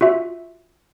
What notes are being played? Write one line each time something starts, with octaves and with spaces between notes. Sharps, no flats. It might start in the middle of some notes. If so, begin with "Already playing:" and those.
F4 F#4 E5